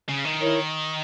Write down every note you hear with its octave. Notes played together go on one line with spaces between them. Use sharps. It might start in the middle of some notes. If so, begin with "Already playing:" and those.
C#3
D#3
E4 A#4 C#5